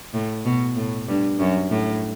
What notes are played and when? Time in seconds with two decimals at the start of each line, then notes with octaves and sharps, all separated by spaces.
0.14 A2
0.45 B2
0.76 A2
1.08 G2
1.39 F#2
1.70 A2